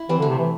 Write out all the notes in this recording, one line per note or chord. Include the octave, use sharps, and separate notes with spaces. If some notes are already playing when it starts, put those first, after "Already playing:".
Already playing: E4
E3 G3 C4
D3 A3
C3
E3